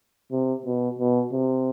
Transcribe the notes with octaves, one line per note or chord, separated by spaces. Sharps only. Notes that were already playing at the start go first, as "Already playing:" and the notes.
C3
B2
B2
C3